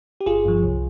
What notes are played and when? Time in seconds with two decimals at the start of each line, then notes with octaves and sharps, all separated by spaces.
0.21 G4
0.26 G1 F4 G#4
0.45 G2 F3
0.63 C2